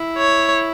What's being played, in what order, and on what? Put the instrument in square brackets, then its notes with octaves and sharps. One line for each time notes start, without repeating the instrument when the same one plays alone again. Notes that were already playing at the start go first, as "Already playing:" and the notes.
Already playing: [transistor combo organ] E4
[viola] C#5